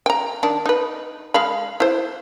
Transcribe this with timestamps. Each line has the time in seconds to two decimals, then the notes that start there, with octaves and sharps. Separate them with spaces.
0.06 G5 A#5
0.43 D#3 D4
0.66 D#4 B4
1.34 G#3 F5 B5
1.80 E4 C5